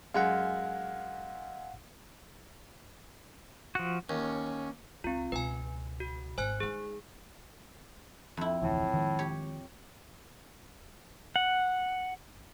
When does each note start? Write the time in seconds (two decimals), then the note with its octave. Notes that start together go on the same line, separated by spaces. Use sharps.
0.14 F#2 G#3 F5 F#5
3.75 F3 F#4
4.09 D#2 C#4
5.04 C#2 C4 F4
5.32 C#2 B2 B4 G#5
6.00 F#4
6.38 G#1 C5 G#5 F#6
6.60 G#3 D#4 G#4
8.37 F2 E4
8.62 F1 D2 A2 E3
8.94 D#3 F3 G#3
9.19 G4 C#5
11.36 F#5